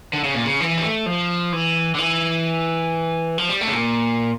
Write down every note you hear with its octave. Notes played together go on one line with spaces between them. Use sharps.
D3
C#3
A#2
C#3
E3
G3
A3
F3
E3
D3
E3
F3
G3
A3
C#3
A#2